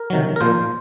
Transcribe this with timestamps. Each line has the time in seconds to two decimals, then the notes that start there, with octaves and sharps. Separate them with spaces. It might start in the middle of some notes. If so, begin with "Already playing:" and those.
Already playing: A#4
0.10 C3 D#3 F#3
0.36 A#4
0.41 A#2 F3 C5